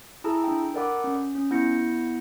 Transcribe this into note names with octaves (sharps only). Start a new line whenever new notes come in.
E4 G#4 A4 A5 A#5 E6
D4 G5
A4 A#4 D5 F#5 B5 D6
C#4
C#4
B3 E4 G6 A#6 C#7